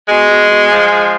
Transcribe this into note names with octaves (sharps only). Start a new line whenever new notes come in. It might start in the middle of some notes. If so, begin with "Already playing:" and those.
B2 G#3
B2
B2
F3
F3